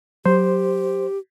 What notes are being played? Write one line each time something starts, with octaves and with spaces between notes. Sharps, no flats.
F#3 G4 C5